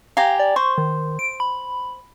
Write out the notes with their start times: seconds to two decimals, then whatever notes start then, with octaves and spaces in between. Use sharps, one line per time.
0.17 G4 F5 G#5 A#5
0.39 D5
0.56 C5 C#6
0.78 D#3
1.19 D7
1.40 B5